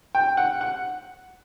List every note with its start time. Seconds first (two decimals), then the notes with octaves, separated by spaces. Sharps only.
0.15 G5
0.37 F#5
0.61 F#5